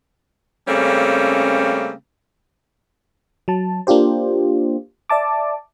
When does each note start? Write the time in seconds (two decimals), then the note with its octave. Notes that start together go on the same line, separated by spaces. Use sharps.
0.68 C#3 G3 A3 A#3 C4 C#4
3.48 F#3 A5
3.87 A#3 D4 F4 G4 C5
5.10 D5 E5 A5 D6